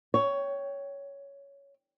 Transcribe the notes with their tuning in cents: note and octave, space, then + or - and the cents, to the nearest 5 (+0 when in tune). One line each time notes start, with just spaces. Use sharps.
C#5 +10 G5 +0